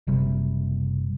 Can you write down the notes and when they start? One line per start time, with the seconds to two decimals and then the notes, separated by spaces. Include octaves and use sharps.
0.07 F#1 C3 G3